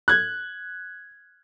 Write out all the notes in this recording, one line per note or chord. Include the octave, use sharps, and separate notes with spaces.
F#6 G#6